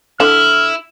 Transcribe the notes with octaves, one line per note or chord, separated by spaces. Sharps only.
D3 E4 F6